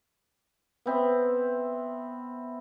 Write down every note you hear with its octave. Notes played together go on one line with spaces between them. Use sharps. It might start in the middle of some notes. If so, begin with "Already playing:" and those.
B3 C4 E5